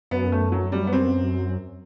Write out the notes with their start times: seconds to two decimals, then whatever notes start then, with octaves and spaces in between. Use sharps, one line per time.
0.11 F#2 B3
0.32 A3
0.52 F#3
0.72 G3
0.87 B3
0.93 C4